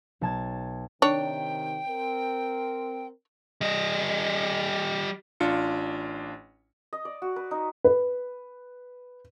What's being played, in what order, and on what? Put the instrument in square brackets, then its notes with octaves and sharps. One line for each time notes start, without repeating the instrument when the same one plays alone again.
[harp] B1 A5 G#6
[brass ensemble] C3 D#3 [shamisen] D4 C#5 [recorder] G5
[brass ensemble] C4 A#4
[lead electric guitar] G3 D#5
[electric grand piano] A1 D4 F4 C#7
[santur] D#5
D5
F#4
B4
D#4
[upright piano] B4